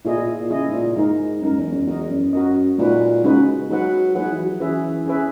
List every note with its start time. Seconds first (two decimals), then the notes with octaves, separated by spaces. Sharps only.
0.05 A#2 E4 G#4 D#5
0.17 A#2
0.39 A#2
0.50 C#3 E4 G#4 D#5
0.68 G#2
0.73 A#2
0.95 G#2 G#3 D#4 A#4
1.41 F#2 G#3 D#4 A#4
1.57 E2
1.72 F#2
1.87 E2 F#4 A#4 D#5
2.10 F#2
2.33 F#4 A#4 D#5
2.78 A#2 G#3 D#4 F#4 B4
3.24 C#3 G#3 D#4 F#4 B4
3.69 F#3 A#3 D#4 G#4 B4 F#5
4.15 F#3 A#3 D#4 G#4 B4 F#5
4.31 E3
4.45 F#3
4.60 E3 C#4 G#4 B4 E5
5.07 C#4 G#4 B4 E5